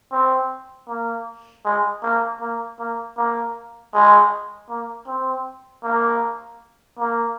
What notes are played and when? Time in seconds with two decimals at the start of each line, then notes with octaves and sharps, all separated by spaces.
0.12 C4
0.88 A#3
1.65 G#3
2.03 A#3
2.41 A#3
2.79 A#3
3.17 A#3
3.94 G#3
4.69 A#3
5.07 C4
5.84 A#3
6.99 A#3